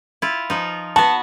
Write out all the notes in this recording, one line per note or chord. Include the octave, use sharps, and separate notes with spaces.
E4 F4
F3 D#4
B3 F#4 A5